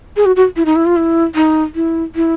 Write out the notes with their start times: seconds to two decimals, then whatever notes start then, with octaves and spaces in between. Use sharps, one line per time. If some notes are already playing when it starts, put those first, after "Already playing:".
0.16 G#4
0.26 F#4
0.36 F#4
0.56 E4
0.65 D#4
0.76 E4
0.86 F4
0.96 E4
1.35 D#4
1.75 E4
2.15 E4